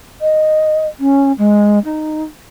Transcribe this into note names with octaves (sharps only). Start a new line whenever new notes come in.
D#5
C#4
G#3
D#4